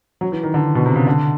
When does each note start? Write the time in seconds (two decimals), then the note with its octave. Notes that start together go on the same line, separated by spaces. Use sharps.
0.21 F#3
0.32 E3
0.43 D#3
0.54 D3
0.75 B2
0.86 C3
0.96 C#3
1.07 D3